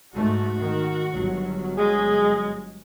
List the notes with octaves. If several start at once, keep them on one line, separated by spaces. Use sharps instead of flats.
G#2 A3 F#4
D#3
G1 F#3
G#3 G#4